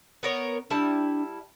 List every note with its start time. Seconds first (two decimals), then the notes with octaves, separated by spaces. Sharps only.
0.23 B3 A#4 C#5
0.70 G3 D4 E4 A5